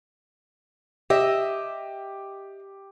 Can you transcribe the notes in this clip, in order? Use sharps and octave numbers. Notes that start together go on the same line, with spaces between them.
G4 D#5 E5